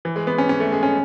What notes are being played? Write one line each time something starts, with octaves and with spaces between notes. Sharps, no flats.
E3
G#3
B3
C#4
C#4
A3
G#3
C#4